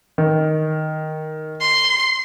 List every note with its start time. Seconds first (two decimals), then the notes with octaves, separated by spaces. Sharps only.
0.18 D#3
1.60 C6